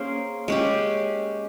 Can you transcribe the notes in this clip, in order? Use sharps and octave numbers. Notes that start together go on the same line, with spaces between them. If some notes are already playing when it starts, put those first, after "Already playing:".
Already playing: A#3 C#4 G#4 C5
G#3 C#4 G4